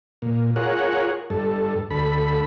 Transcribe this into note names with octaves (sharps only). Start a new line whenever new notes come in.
A#2
F4 G#4 A#4 C#5 F#5
G2 A4
D2 A4 B5